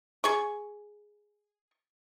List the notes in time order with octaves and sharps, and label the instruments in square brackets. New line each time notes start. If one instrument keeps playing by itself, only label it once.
[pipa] G#4 C#6